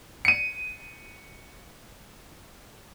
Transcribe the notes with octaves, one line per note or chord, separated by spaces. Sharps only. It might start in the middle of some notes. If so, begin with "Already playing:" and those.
C#7 D#7